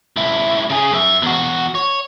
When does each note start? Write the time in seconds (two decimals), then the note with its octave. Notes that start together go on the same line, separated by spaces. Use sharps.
0.16 C#2 E4
0.70 C#3 G#4
0.91 F#2 E5
1.22 E2 F#4
1.75 C#5